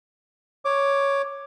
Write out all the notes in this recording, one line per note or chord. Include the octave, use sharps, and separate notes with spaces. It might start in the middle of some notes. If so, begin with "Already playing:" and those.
C#5 D6